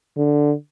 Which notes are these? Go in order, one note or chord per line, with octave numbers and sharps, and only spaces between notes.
D3